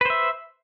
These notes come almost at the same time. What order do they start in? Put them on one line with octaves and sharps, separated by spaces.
B4 C5 E5